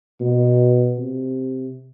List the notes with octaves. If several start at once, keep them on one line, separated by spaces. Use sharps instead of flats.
B2
C3